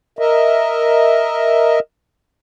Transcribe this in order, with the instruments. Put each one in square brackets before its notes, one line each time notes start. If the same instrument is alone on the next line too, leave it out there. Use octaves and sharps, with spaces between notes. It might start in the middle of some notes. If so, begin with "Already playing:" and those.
[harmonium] A#4 D#5 E5